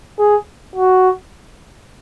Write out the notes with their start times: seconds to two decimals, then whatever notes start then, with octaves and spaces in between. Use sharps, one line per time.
0.19 G#4
0.76 F#4